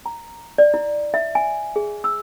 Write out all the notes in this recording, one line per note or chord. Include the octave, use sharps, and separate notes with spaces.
A#5
D5
E4
E5
G#5
G#4
E6